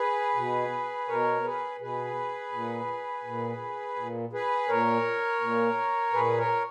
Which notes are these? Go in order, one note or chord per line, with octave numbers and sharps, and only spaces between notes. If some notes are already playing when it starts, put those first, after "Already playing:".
Already playing: G#4 B4
B2
B2 A#4 C#5
G#4 B4
B2 G#4 B4
A#2
A#2
A#2
G#4 B4
A#2 A#4 C#5
A#2
A#2 G#4 B4
A#4 C#5